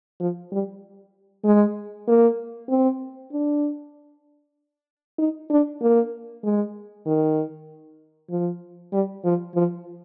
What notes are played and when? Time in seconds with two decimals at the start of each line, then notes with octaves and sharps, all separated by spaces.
0.20 F3
0.52 G3
1.44 G#3
2.08 A#3
2.69 C4
3.32 D4
5.18 D#4
5.50 D4
5.81 A#3
6.43 G#3
7.06 D#3
8.30 F3
8.92 G3
9.24 F3
9.55 F3